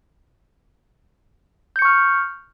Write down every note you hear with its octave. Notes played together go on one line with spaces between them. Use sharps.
C#6 F6 G6 C#7